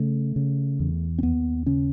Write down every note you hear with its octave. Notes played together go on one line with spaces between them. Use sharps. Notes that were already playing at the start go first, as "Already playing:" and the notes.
Already playing: C#3 A3
C#3
E2
C4
D#2 B3
C#3 C#4